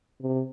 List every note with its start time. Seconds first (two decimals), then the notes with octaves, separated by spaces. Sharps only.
0.23 C3